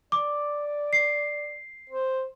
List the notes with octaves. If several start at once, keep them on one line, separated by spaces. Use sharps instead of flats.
D5 D6
C7
C5